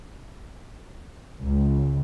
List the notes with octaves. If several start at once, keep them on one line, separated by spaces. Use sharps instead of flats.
C#2